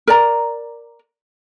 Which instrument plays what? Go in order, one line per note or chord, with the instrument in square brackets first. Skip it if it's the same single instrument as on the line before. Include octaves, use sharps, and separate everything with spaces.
[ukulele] A#4 D5 A#5